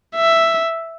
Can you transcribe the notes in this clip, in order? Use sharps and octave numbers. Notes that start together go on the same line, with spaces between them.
E5